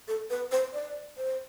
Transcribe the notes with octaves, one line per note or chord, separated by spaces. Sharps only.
A4
B4
C5
D5
C5